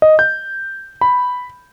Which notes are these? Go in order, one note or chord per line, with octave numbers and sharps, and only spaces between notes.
D#5
G6
B5